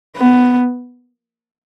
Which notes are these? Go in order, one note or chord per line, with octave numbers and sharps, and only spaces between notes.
B3